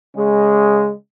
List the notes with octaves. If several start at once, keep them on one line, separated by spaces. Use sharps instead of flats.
C#3 G#3